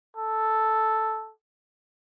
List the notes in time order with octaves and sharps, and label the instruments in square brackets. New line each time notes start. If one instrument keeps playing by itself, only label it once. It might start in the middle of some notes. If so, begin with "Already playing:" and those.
[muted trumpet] A4